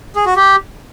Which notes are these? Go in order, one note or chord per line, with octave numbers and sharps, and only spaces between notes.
G#4
F#4
G4